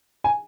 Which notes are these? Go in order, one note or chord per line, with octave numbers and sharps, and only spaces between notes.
G#5